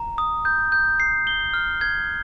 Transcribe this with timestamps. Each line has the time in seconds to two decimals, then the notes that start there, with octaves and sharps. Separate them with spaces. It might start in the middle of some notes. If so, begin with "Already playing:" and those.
Already playing: A#5
0.18 D#6
0.45 G6
0.72 G6
1.00 C7
1.27 G7
1.54 F6
1.81 G#6